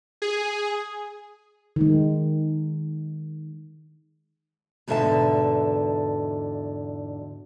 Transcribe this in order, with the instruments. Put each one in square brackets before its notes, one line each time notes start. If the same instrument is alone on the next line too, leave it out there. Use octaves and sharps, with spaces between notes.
[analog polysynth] G#4
[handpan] D#3 G#3
[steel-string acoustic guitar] E2 G#2 B2 D3 E5 A5